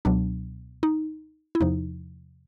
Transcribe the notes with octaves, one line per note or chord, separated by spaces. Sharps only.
C#2 B2 F#3 B3 D4
D#4
E4
E2 C3 F3 D#4